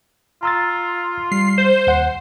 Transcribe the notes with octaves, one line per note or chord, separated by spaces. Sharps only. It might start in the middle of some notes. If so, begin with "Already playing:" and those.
F4 A#5 E6 A6
G3 C7
C5
D#2 F#5